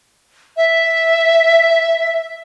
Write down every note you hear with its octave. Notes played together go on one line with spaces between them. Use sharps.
E5